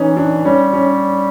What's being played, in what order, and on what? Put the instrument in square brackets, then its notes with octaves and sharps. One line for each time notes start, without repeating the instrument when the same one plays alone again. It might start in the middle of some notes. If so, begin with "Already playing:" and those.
Already playing: [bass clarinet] E3 [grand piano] C#4 D#4
[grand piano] D4
[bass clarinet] G3 [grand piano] C#4
[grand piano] C#4